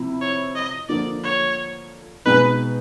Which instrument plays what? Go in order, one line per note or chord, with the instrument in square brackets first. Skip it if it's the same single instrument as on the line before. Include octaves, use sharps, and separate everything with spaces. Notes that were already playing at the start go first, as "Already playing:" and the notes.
Already playing: [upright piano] C3 F3 C4 E4
[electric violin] C#5
D#5
[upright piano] D3 F3 A#3 [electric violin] D5
[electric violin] C#5
[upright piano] B2 G#3 B3 D#4 G#4 [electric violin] B4